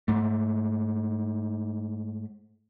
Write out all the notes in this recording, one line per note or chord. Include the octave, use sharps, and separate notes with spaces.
G#2 A3